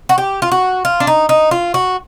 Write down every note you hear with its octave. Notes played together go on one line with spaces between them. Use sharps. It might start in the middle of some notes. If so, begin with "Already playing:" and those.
F#4
G4
F4
F#4
F4
D4
D#4
D#4
F4
F#4